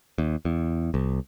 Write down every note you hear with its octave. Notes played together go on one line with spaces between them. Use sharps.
D#2
E2
C2